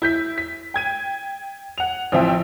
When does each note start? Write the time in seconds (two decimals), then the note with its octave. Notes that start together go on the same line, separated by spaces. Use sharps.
0.02 E4 G6 B6
0.38 B6
0.74 G5 G#6 D#7
1.78 F#5 F7
2.12 A1 F3 C4 E5 G5